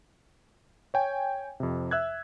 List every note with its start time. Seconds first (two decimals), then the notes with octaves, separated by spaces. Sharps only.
0.94 C#5 G5 G#5
1.60 F2 C3
1.91 E5 E6 F#6 G#6